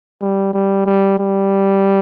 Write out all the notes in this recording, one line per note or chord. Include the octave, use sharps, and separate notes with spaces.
G3
G3
G3
G3